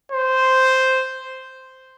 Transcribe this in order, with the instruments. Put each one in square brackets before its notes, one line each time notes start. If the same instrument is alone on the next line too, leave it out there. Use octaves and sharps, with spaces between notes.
[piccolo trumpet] C5